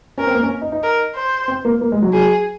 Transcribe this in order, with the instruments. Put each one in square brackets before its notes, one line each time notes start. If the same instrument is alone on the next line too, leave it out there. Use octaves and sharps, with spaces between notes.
[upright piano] C#4 [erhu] A#4
[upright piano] C4
A#3
C#4
D#4
D#4
[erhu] A#4
C5
[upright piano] C4
A#3
A#3
G#3
F#3
[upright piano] F#3 [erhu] G#4